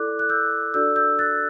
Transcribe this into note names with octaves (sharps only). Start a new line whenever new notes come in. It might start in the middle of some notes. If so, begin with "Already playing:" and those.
Already playing: E4 A4 D5 D6 F#6
F#6
E6 G6
D4 F#4 A4 D5 E6 G6
E6 G6
F#6 A6